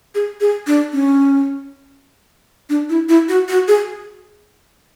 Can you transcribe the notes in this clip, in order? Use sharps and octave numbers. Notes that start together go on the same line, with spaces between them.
G#4
G#4
D4
C#4
D4
E4
E4
F#4
F#4
G#4